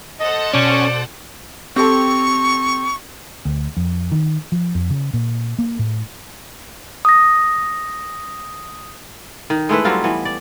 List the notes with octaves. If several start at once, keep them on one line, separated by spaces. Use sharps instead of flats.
A4 C5 D#5 F#5
B2 C#4 D5 G6 C#7
C4 G4 A4 C#6
D2
F2
D#3
F3
F2
C#3
A#2
A#3
A2
D#6 A#6
D#3
G#3 A3 E4 B4
F#3 G3 C4 F4
E3 B3
D5